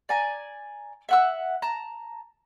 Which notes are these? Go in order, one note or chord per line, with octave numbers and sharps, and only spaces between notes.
D5 G#5 A#5
E5 F#5 E6
A5 A#5